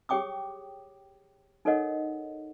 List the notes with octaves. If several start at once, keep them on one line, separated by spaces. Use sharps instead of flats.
G4 G#4 C#5 G5 D6 D#6
D#4 A4 A#4 C#5 D#5 F#5